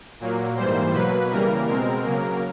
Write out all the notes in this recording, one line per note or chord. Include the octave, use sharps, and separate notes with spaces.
A#2 F#3 A#3
G#2 E3 G3 A#3 C5
B2 F#3 A#3 B4
C#3 E3 G3 A#3 A#4
B2 G#3 C4 A#4
C#3 F#3 A#3